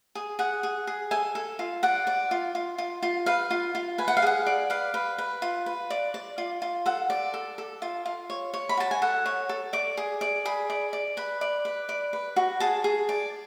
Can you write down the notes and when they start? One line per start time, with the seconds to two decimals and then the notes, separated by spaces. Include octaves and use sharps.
0.15 G#4
0.39 G#4 F#5
0.63 G#4
0.87 G#4
1.11 A4 G#5
1.35 A4
1.59 F4
1.83 D5 F#5
2.07 D5
2.31 F4
2.55 F4
2.78 F4
3.02 F4
3.26 B4 F5
3.51 F4
3.75 F4
3.98 B4 G#5
4.08 F#5
4.17 F5
4.22 G#4 F#5
4.46 D5
4.70 B4 F5
4.94 B4
5.18 B4
5.42 F4
5.66 B4
5.90 D5
6.14 D5
6.38 F4
6.62 F4
6.86 A4 F#5
7.10 D5
7.34 A4
7.58 A4
7.82 F4
8.06 F4
8.30 C#5
8.54 C#5
8.69 B5
8.77 F#4 A5
8.91 G#5
9.02 A4 F#5
9.26 C#5
9.49 A4
9.73 D5 D6
9.97 G#4
10.21 D5
10.45 G#4 B5
10.70 D5
10.93 D5
11.17 B4 B5
11.41 D5
11.65 B4
11.89 D5
12.13 B4
12.36 F#4
12.60 G#4 A5
12.84 G#4
13.09 D5